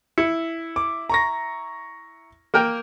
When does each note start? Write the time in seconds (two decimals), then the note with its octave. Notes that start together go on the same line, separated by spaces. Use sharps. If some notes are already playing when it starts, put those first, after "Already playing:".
0.18 E4 C#7
0.76 D6
1.09 A#5 C#6 A#6
2.54 A#3 A#4 G5